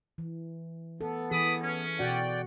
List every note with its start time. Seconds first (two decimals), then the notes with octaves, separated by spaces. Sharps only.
0.18 E3
1.01 B3 A4
1.31 E3 G#4 B5 D6 D#6
1.63 C#4
1.99 B2 F#4 D5 F#5 G5